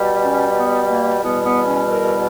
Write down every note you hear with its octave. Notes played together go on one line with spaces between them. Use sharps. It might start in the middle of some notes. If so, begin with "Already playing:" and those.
Already playing: B2 G3
C#4
B3
A#3
E2 B2 G3 B3
B3
C#4
A#4